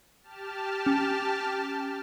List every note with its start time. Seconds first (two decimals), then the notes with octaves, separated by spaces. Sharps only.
0.23 G4 A5 F6
0.86 C#4